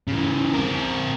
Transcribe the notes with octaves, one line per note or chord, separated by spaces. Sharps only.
C#3 E3
C4 A#4